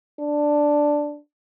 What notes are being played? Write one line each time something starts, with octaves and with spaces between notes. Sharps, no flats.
D4